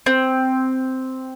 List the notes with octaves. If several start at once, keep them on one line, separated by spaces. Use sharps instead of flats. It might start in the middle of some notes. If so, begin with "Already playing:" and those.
C4